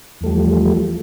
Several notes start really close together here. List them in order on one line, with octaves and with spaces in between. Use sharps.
E2 A3 G3 F3